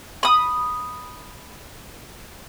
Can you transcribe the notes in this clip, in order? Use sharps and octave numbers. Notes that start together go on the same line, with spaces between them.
B5 D#6